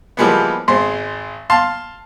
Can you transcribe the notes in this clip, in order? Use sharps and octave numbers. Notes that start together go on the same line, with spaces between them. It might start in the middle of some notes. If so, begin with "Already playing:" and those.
E3 F3 G3 G#3 A#3 B3
G#1 G#3 C5 C6
F5 A5 C6